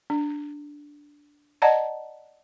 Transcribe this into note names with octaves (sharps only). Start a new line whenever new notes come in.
D4
D5 D#5 F#5 A5 A#5